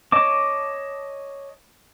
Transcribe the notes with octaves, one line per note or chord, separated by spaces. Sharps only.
C#5 D#5 A5 D6